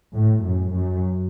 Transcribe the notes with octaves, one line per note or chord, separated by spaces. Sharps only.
A2
F#2
F#2